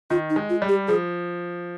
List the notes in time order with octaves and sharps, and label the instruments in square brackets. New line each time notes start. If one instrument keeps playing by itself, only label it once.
[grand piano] D#3 [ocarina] F4
[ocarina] D#4
[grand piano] G#3
[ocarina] F4
[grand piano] G3
[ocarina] G4
[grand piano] F3 [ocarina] G#4